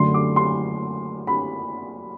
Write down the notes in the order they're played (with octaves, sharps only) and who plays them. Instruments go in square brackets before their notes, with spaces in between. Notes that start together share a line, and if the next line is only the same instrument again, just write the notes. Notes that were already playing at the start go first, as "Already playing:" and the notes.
Already playing: [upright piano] F#2 D3 A3 C6
D6
C6
B5